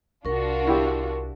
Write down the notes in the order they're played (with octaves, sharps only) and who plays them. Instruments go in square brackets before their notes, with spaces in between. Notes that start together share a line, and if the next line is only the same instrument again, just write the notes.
[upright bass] C2 [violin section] D4 F4 F#4 [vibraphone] A#4 C#6
[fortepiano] E4 G4